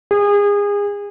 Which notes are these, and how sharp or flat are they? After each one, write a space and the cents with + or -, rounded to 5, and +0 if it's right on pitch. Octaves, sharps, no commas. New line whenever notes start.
G#4 -30